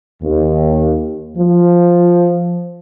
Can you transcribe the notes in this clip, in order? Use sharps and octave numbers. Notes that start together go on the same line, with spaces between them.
D#2
F3